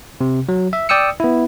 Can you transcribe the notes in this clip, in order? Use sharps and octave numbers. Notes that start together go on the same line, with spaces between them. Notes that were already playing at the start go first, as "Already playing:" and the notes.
C3
F#3
E5
D5 G5 D#6 E6 C#7
B3 E4